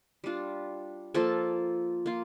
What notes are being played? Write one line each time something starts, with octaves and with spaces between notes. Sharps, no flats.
G3 D4 F4
F3 A#3 F4 A4
A#3 F4